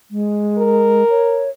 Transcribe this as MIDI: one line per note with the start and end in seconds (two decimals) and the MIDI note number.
0.11 1.03 56
0.58 1.47 70
1.10 1.50 73